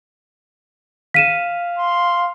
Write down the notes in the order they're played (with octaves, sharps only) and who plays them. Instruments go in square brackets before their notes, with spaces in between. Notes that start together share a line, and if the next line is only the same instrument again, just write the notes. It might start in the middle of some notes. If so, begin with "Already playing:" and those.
[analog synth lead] F5 [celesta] B6 D#7 E7
[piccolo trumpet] C6